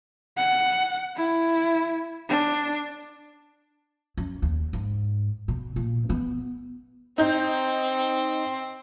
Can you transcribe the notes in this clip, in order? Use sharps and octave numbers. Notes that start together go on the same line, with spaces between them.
F#5
E4
D4
F#2
D#2
G#2
B2
A#2
E3 B3
C4 D#4 G6